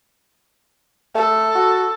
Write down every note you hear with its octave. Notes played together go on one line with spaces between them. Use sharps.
A3 A4
F#4